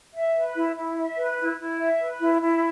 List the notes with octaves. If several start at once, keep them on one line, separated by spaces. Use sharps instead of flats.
E5
B4
E4
E4
E5
B4
E4
E4
E5
B4
E4
E4